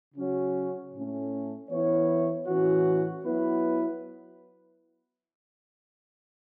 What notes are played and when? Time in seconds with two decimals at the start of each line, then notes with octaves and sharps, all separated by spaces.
0.14 C#3 F#3 C#4 F#4 C#5
0.92 A2 A3 C#4
1.69 E3 B3 E4 C#5
2.46 A2 E3 C#4 F#4
3.24 F#3 B3 E4 B4